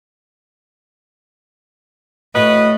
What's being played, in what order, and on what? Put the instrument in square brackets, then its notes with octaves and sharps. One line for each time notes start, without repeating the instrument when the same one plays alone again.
[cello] A2 [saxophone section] F#4 B4 D#5